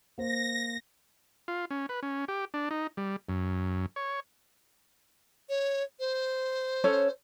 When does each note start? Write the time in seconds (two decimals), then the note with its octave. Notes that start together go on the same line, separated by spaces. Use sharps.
0.18 A#3 C5 A#6
1.48 F4
1.71 C#4
1.89 B4
2.03 C#4
2.28 G4
2.54 D4
2.71 D#4
2.97 G3
3.29 F#2
3.96 C#5
5.49 C#5
6.00 C5
6.84 C#4 A4 C#5